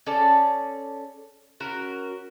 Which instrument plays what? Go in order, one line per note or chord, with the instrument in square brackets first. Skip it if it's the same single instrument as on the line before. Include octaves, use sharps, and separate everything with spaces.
[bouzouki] C#4 A4 D5 A5
C#4 F#4 A#4